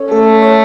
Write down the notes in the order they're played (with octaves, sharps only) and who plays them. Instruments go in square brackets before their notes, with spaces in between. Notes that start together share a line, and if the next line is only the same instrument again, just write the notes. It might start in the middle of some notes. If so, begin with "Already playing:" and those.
Already playing: [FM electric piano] C#4 A4 C#5
[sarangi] A3 [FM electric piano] A4
[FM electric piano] C#5